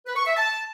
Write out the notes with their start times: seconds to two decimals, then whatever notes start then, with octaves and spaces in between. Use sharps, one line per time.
0.06 B4
0.16 C#6
0.26 E5
0.36 A5